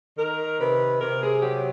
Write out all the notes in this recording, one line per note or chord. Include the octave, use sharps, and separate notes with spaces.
D#3 A#4
C3 B4
C3 A#4
G#4
F#3 G4